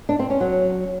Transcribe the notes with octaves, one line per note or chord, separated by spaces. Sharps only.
D4
C4
C#4
F#3